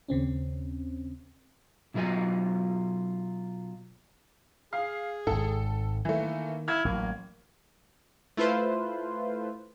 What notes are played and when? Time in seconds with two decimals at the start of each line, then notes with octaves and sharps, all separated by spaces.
0.08 D#2 C#3 C4 C#4
1.94 B2 F#3 F4 A#4 D#5 G#5
4.73 G#4 F5
5.27 G#1 G#2 A4
6.05 D#3 E3 A3 A#3
6.68 E4 F6 G#6
6.85 A1 F#3 A#3
8.37 A3 E4 F4 B4 C5